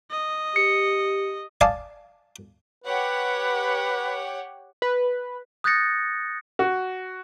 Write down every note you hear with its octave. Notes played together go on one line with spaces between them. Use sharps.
D#5
G4 C#7
D5 F5 G#5 A5 D#6
G4 B4 C#5 F#5
B4
D#6 F#6 G6 A6 A#6 C#7
F#4